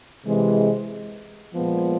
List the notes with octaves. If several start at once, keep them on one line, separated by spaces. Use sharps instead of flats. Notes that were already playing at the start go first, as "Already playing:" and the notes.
C3 E3 G#3
A#2 F3 G#3 B3